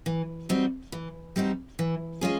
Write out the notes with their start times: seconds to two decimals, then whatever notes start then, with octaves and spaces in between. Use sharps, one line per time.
0.06 E3
0.49 G3 C4 D#4 F#4
0.92 E3
1.36 G3 C4 D#4 F#4
1.79 E3
2.21 G#3 C#4 F4 G#4